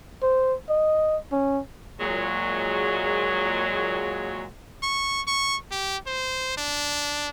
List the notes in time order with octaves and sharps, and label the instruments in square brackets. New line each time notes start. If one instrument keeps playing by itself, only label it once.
[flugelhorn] C5
D#5
C#4
[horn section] A#2 F#3 G#3
[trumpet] C#6
C#6
G4
C5
D4